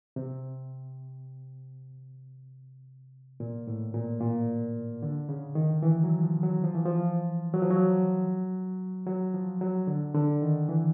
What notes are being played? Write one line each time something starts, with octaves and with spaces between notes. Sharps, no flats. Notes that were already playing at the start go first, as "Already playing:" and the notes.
C3
A#2
A2
A#2
A#2
D3
C#3
D#3
E3
F#3
F3
F#3
F3
E3
F3
F#3
F3
F#3
F#3
F3
F#3
D3
D3
D#3
E3